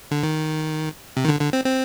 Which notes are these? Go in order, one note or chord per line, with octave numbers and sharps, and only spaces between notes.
D3
D#3
C3
D#3
D3
D3
C4
C4